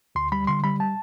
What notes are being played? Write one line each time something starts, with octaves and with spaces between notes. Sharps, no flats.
D2 C6
G3 B5
D3 C6
G3 B5
A5